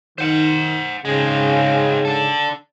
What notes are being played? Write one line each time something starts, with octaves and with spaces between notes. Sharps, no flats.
D#3 C5 F#5
G#2 C#3 G#3 C4
D4 A4